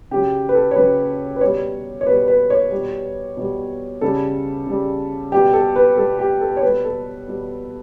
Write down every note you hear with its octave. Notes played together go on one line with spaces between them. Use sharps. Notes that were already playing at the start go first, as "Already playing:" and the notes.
C#3 F#3 G4
B4
A4
C#5
C#3 F#3 B4
B4
B2 G3 C#5
C#5
B2 G3 B4
B4
C#5
G3
B2
B2 G3
C#3 G3 A4
C#3 G3
B2 G3 G4
A4
B4
B2 G3 A4
G4
A4
C#5
B2 G3 B4
A4
B2 G3